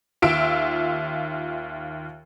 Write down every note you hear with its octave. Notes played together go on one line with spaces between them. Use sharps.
D#2 F4 E5 E6 D7